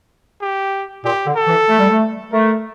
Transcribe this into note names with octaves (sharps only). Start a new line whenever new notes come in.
G4
A#2 G4
D3
A4
E3
A3
G3
A3
A3 A#4